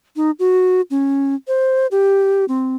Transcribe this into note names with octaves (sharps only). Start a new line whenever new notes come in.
D#4
F#4
C#4
C5
G4
C4